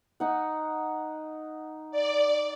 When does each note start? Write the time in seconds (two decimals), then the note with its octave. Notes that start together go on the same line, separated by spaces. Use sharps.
0.20 D#4 F#5
1.91 D5